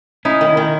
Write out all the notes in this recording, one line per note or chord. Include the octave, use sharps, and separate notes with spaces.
C#4 D#4 E4
D#3
C#4 E4
D#3